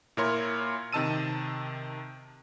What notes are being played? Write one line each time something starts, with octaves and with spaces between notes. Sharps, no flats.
A#2 E4 A#4 C#5 C6
C3 D#3 D#5 A5 E6 D#7